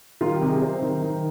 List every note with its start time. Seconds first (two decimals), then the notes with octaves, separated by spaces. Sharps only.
0.21 D#3 F4
0.34 G4
0.41 C3
0.48 G#4
0.62 C3 C5
0.82 D#3
1.02 D#3